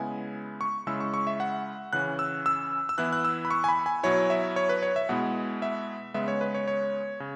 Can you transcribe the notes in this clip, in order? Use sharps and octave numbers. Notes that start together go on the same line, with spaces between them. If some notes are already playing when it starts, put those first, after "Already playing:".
Already playing: C#3 G#3 B3 E4 G#5
C#6
C#3 G#3 E4 E6
C#6
C#6
E5
F#5
C#3 E3 C#4 F#6
E6
E6
E6
E3 B3 E4 F#6
F#6
E6
B5
C#6
G#5
B5
G#5
B2 F#3 E4 C#5
E5
C#5
B4
C#5
E5
B2 G#3 B3 E4 F#5
E5
C#3 G#3 B3 E5
C#5
B4
C#5
C#5
C#3